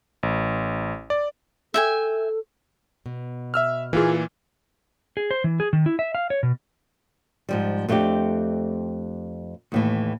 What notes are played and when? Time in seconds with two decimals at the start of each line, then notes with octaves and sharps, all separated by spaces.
0.23 A1
1.10 D5
1.74 A4 E5 G5 G#5
3.06 B2
3.54 E5 E6 F6
3.93 A#2 E3 A#3 F4 G#4
5.17 G#4
5.31 C5
5.44 E3
5.60 G#4
5.73 D#3
5.86 E4
5.99 E5
6.15 F5
6.30 C#5
6.43 B2
7.49 G#2 F3 G3
7.88 F2 A3 C4 D4 G4
9.72 D#2 A2 E3